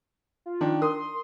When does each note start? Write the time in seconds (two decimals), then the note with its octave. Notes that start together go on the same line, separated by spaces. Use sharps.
0.46 F4
0.61 D#3 D4
0.82 A#4 C6 D#6